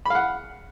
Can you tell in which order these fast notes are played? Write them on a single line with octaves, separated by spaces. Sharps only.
B5 F5 F#5